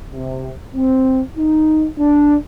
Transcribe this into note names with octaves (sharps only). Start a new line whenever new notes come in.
C3
C4
D#4
D4